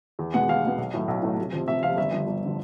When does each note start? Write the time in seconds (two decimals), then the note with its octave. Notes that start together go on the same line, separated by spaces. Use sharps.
0.19 E2
0.34 B2 G#3 B3 F#5
0.49 E2 F5
0.64 B2 G#3 B3
0.78 B1
0.94 A2 F#3 A3
1.08 B1
1.23 A2 F#3 A3
1.38 F1
1.52 F2 C3 F3
1.68 F1 E5
1.83 F2 C3 F3 F5
1.97 G1 E5
2.12 G2 D3 F3
2.27 G1
2.45 D3 F3